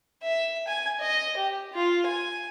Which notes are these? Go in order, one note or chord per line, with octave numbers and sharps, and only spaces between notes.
E5
G#5
D#5
G4
F4
G#5